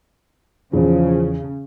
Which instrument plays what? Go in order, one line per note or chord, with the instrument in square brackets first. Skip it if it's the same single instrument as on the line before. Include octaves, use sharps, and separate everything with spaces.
[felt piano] E2 [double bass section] C#3 [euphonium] F3